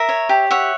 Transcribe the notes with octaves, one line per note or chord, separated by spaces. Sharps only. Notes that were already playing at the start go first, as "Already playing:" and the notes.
Already playing: A#4 E5
C#5
G4
C#5 E5 F#5